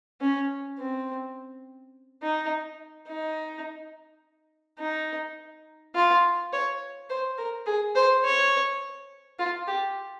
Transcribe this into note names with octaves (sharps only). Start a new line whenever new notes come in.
C#4
C4
D#4
D#4
D#4
F4
C#5
C5
A#4
G#4
C5
C#5
F4
G4